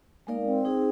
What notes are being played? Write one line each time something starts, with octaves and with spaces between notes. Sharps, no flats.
G#3 A#3 D#4 A#4 D5 F5
A#3
C4
D#4 G#4 C5